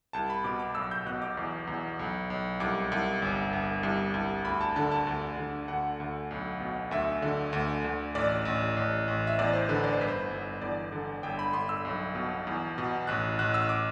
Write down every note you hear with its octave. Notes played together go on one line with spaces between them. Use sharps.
C2 A5
B5
B2 D6
D6
B1 E6
G6
B2 F#6
D6
E2
E2
B1
B1
C2 D6
C2
G1
G1
C2
C2
D2 B5
A5
D3 A5
A5
D2
D3
D2 F#5
D2
B1
B2
D2 E5
D3
D2
D2
A1 D5
A1
A1
A1
E5
E2 D5
C5
D3 B4
D5
C5
G1 B4
C5
G1
E2 D5
D3
G1 G5
B5
G1 C6
E6
B1
B2
E2
B2
A1 F#6
A1 F#6
E6
D6